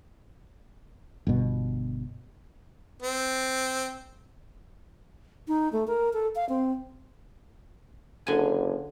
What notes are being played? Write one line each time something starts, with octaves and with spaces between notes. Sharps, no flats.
G1 B2
C4
D#4
A3
A#4
A4
F5
C4
F#1 D3 G#5